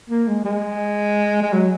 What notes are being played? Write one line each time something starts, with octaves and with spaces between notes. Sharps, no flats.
A#3
G#3
G#3
G#3
F#3